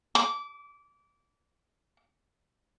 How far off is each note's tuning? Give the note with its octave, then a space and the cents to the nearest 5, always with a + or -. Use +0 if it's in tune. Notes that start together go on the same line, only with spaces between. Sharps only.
D6 -25